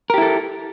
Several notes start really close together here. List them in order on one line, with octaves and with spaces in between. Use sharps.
A#4 G4 E4 A4